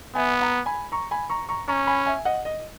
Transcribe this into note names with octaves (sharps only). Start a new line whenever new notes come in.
B3 E5 G#5
F#5 A#5
G#5 B5
A#5 C#6
G#5 B5
A#5 C#6
A#5 C#6
C#4 A#5 C#6
G#5 B5
E5 G#5
D#5 F#5
D#5